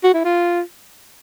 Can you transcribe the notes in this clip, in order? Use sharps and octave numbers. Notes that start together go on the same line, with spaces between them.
F#4
E4
F4